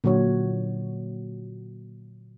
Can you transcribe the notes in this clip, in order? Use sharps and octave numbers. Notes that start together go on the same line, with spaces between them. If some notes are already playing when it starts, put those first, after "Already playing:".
A#2 D3 F#3 F#4 C#5